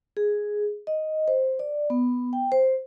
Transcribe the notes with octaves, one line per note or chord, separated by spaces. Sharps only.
G#4
D#5
C5
D5
B3
G5
C5